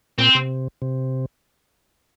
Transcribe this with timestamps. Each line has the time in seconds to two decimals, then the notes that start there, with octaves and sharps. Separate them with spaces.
0.18 A#2 C4
0.35 C3
0.82 C3